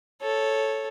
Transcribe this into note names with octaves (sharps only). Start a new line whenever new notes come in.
A4 C#5